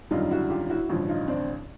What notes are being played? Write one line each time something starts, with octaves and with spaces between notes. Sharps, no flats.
G#1 F#2 D3 G3 D#4 F4
E4 F#4
F4 G4
E4 F#4
A1 G2 D3 F3
D#4 F4
C4 D4